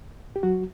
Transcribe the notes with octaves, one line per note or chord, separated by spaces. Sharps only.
G4
F#3 F#4